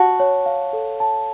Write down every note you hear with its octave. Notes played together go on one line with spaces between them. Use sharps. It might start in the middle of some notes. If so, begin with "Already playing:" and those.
Already playing: F#4 A5
C#5
F5
A4
A5